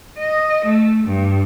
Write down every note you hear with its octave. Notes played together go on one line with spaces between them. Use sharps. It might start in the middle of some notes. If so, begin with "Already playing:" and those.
D#5
A3
G2